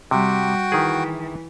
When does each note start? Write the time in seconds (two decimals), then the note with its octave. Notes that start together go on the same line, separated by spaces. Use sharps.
0.11 C3 G3 F#4 G5
0.72 D#3 E3 G#4